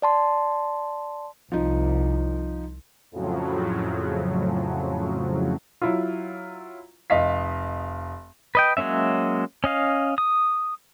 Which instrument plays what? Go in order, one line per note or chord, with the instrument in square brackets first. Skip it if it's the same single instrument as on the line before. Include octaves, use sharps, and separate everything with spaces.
[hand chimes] D5 A5 C6
[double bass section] C2 [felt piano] F3 D#4
[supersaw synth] F2 A2 C#3 F3 F#3
[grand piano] F#3 E4 F4
F1 D#5 F5 B6
[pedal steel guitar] B4 D#5 G5
F#3 G#3 A#3 C#4 E5
C#4 D#5 F5
D#6